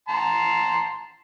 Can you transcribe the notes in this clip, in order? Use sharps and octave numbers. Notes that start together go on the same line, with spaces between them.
A5 A#5 C6